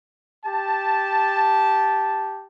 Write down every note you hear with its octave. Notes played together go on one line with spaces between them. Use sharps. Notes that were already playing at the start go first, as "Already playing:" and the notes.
G4 A5